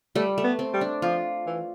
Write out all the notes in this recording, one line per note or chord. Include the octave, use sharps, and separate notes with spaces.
G3 A3
A3
B3
C4
G3
D4
F3 F4
E3